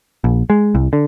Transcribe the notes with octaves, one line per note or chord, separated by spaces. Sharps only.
A#1
G#3
C2
D3